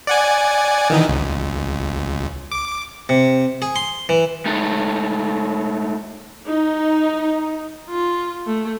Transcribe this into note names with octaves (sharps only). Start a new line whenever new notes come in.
D5 F#5 G#5
D#3 E3 D#4
C#2
D6
C3
G#4
C6
E3
G#3 A3 D#4 A4
D#4
F4
A3